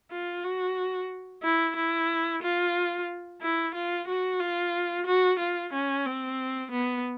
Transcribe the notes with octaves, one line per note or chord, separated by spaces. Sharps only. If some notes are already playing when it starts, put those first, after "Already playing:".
F4
F#4
E4
E4
F4
E4
F4
F#4
F4
F#4
F4
C#4
C4
B3